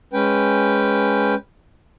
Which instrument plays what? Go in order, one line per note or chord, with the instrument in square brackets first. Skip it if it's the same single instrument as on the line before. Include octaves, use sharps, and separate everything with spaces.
[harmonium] G#3 C#4 B4 G5